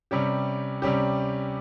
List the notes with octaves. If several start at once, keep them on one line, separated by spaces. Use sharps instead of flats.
C3 G3 C#4 G4
C3 G3 C#4 G4